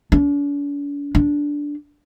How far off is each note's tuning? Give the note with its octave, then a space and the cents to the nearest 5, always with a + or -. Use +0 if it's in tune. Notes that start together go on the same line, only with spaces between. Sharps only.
D4 -45
D4 -10